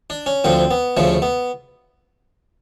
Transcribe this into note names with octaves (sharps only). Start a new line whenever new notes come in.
D4
C#4
D2 D3 F3 C4
B3
D2 C#3 F3 A3
B3